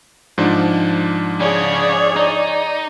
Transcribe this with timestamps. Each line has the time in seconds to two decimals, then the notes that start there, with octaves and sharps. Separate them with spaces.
0.38 G#2 F3 D4
1.40 C#3 C#4 G#4 C#5 D5
2.16 D#4